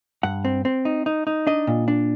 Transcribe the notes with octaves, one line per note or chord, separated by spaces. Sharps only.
G2 F#5
C4
C4
D#4
D#4
D#4
D4 D#5
A#2
D4